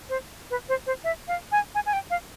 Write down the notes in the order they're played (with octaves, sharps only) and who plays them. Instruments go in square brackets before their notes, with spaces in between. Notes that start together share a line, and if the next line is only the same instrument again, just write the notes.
[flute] C5
B4
C5
C5
E5
F5
G#5
G#5
G#5
G5
F5